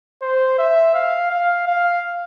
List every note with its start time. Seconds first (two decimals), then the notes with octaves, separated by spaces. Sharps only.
0.21 C5
0.58 E5
0.95 F5
1.31 F5
1.67 F5